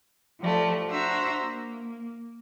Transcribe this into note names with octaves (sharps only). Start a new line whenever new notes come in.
F3 G3 A3
D4 F#4 C5 E5 A#5
A#3